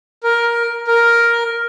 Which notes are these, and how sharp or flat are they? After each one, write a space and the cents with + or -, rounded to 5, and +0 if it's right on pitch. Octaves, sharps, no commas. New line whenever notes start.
A#4 +10
A#4 +5